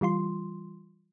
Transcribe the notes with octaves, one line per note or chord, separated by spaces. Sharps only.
E3 G3 F4 C6